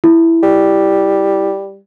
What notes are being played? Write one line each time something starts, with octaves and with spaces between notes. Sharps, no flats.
E4
G3